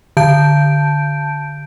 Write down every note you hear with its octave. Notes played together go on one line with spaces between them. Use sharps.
D3 A5 G6 D7